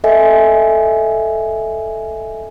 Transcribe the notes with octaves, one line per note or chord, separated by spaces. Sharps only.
A4 D#5 E5 G#5